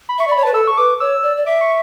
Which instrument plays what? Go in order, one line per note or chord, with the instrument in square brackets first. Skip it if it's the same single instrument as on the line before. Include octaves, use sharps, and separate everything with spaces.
[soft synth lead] B5
[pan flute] E5 [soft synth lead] C#6
[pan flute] D5
[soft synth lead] B5
[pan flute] C#5
[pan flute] B4 [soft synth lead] A5
[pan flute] A4 [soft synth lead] E6
[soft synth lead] C#6
[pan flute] B4 [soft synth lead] D6
[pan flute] C#5 [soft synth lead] E6
[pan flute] D5
D5
[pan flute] E5 [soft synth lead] D6
[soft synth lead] C#6